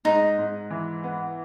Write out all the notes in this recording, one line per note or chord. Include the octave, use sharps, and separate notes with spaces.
G#2 D#4
G#2
E3
B3